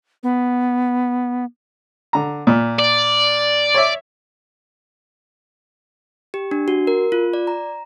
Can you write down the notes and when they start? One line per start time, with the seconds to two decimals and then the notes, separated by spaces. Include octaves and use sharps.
0.23 B3
2.13 D3 A#5
2.47 A#2
2.79 D5
3.74 C#5 E5
6.34 G4
6.51 D4
6.68 F#4
6.87 A#4
7.12 F4
7.33 D5
7.47 A#5